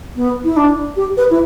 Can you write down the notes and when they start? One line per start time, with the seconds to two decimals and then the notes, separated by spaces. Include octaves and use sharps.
0.15 B3
0.44 E4
0.56 D4
0.96 G4
1.17 B4
1.30 E4